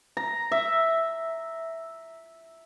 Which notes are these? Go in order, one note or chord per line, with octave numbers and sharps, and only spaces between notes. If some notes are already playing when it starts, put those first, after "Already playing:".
A#5
E5